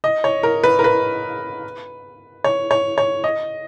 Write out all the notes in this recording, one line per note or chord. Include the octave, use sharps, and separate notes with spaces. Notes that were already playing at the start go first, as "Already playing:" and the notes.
D#5
C#5
A#4
B4
A#4
B4
C#5
C#5
C#5
D#5